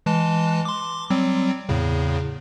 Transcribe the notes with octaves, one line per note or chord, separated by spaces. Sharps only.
E3 G#3 A5
C6 D6
F#3 G3 C4
E2 A2 C#3